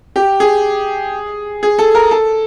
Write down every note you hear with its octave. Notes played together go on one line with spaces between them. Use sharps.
G4
G#4
G#4
A4
A#4
A4